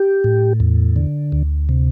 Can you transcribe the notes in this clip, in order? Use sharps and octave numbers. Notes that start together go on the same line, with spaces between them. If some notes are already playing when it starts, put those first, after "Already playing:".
Already playing: G4
A2
E2
D3
D2
C3